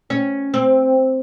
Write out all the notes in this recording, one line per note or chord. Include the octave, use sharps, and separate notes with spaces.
C#4
C4